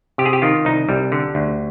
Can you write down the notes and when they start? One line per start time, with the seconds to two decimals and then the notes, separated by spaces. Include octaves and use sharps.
0.18 C3 G4
0.26 G#4
0.33 G4
0.42 D#3 F4
0.65 C2 D#4
0.89 C2 G3
1.12 D3
1.35 D2